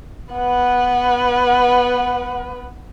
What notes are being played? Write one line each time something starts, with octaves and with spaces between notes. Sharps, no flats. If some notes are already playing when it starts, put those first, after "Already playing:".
B3 B4 F#5